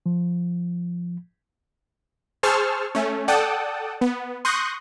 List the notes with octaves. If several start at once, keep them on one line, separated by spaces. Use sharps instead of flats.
F3
G#4 C5 A5 C#6 E6 F6
A3 C#4
A4 D5 F#5 G5 A5 D#6
B3
C6 C#6 D#6 F#6 G6 A#6